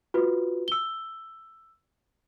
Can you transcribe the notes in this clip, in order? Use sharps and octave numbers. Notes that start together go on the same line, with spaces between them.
F4 F#4 B4
E6 G7